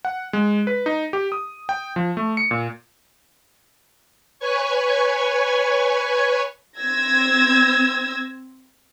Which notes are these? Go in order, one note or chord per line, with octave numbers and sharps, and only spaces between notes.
F#5
G#3
B4
D#4
G4
D#6
G5
F3
A3
C#7
A#2
B4 C#5 G#5 C#6
C4 E6 G#6 A#6